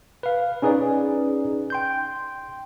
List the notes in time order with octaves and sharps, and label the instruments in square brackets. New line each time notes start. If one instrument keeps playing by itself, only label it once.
[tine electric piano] B4 F5
C#4 D#4 G#4 B4 D5
G5 C6 G6